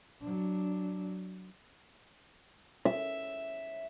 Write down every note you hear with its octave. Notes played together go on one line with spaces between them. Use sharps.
F#3 D4
E5